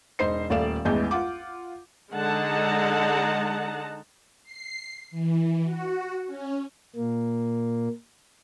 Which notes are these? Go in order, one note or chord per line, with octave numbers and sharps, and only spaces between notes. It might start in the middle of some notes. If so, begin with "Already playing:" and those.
E1 D#4 C5 C7
D#1 A3 D5 F5 E7
A1 E2 E3 G#3 B3 G6
F4 F#5 D6
D3 G#3 D#4 F#5 A5 A#5
C7
E3
F#4
C#4
A#2 A#3